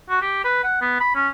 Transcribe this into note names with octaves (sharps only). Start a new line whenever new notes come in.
F#4
G4
B4
F#5
B3
B5
C#4